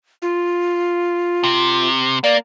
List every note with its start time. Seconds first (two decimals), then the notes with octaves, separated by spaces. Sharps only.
0.22 F4
1.43 C3
2.24 A#3 D5